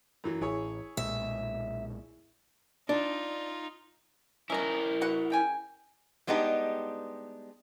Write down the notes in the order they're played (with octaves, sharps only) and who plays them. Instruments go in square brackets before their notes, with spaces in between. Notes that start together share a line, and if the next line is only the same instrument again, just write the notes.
[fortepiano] F#2 E3 F#3
[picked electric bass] A1 [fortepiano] E4 G#4 C#5
[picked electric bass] B1 A#2 G#3 [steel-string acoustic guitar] E5
[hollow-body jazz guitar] D4 [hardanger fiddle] D#4 F4
[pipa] C#4 D#5 A#5 [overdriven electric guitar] E4 A#4
[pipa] F#4 B4 F#5
C#3 G5 G#5
[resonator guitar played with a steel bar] G3 G#3 B3 D4 D#4 G4